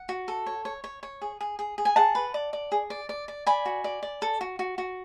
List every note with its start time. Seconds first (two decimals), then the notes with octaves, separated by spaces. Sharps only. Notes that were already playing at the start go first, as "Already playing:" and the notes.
Already playing: F#5
0.09 F#4
0.28 A4
0.46 C#5
0.65 C#5
0.84 C#5
1.03 C#5
1.21 G#4
1.41 G#4
1.59 G#4
1.78 G#4
1.85 G#5
1.96 G#4 F#5 A5
2.15 B4
2.34 D5
2.53 D5
2.72 G#4
2.90 D5
3.09 D5
3.28 D5
3.46 D5 G#5 B5
3.66 F#4
3.84 D5
4.03 D5
4.22 A4
4.41 F#4
4.59 F#4
4.78 F#4